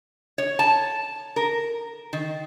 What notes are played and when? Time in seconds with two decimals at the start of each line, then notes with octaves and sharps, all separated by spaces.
0.38 C#5
0.59 A5
1.36 A#4
2.13 D#3